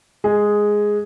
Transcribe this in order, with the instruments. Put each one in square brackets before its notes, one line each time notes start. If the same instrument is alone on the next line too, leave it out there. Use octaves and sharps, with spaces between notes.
[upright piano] G#3 G#4